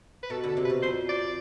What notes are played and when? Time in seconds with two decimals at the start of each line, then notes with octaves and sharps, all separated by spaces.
0.23 B4
0.30 B2 A4
0.43 D3 A4
0.57 C3
0.65 B4
0.70 B2
0.82 F2 C5
1.09 D5